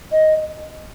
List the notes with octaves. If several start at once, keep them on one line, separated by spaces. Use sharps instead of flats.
D#5